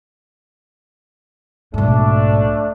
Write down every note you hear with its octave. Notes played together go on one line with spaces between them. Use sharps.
B1 G#2 A3 D4